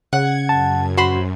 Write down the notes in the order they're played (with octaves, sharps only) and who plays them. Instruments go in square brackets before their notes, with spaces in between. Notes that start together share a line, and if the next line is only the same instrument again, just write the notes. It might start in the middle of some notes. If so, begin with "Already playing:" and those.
[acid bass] C#3 [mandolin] F#5 [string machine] G#6
[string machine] F#2 [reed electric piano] A5
[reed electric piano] F#4 [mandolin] C5 B5 C6